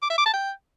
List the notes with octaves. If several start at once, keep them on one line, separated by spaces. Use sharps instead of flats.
D6
E5
D6
A5
G5